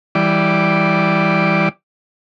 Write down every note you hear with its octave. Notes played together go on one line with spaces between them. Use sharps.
E3 G3 D5